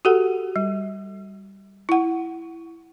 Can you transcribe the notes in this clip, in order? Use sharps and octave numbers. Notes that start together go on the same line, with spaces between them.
F#4 G4 A4 F#5
G3
E4 F#5